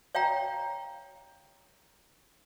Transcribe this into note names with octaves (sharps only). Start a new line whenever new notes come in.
C#5 F5 G5 A#5